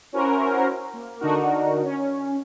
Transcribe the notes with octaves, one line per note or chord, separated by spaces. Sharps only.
C#4 E4 F#4 A#4 C5
A#3
D3 D4 D#4 F#4 A#4
C#4